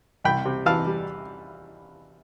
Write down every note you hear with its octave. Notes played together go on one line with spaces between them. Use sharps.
C2 G5 B5
C3
E3 F5 A5
G3